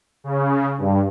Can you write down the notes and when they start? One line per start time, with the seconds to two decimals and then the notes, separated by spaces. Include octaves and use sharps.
0.24 C#3
0.78 G2